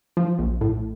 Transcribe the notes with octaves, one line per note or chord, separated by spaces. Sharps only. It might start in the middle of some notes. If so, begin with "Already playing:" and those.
F3
A#1
A2